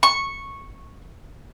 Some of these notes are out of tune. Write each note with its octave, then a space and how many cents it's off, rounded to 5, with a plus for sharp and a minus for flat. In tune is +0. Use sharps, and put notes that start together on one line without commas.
C#6 -10